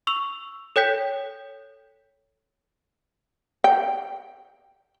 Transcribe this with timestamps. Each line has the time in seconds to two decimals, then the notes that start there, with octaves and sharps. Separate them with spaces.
0.07 C#6 E6 F7
0.76 A4 C#5 G5 G6 B6
3.64 G5